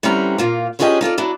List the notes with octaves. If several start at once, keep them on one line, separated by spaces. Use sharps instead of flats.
D3 E3 G3 C4 C#4 A#5
A#2 A#3 F4
F3 C#4 D4 G4 G#4 D#5
D#4 F4 A4 D5
F#3 D4 E4